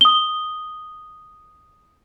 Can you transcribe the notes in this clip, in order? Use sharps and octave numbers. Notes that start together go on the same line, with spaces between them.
D#6 G7